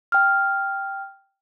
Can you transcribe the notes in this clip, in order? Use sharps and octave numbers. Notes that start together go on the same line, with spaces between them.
G5 F6